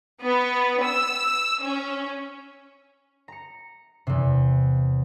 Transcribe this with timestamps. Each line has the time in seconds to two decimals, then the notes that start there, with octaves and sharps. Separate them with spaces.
0.21 B3
0.84 E6
1.62 C#4
3.28 A#5 C#7
4.07 E2 C3